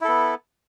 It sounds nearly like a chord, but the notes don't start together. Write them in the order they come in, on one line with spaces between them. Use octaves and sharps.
E4 A4 B3